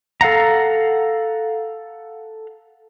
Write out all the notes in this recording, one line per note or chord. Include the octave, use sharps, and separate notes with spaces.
A4 F5 F#5 A#5